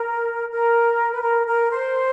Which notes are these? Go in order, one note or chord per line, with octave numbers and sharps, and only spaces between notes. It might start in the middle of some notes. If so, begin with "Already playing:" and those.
Already playing: A#4
A#4
B4
A#4
A#4
C5